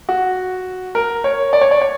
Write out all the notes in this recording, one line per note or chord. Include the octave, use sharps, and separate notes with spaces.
F#4
A#4
C#5
D5
C#5
D5
C#5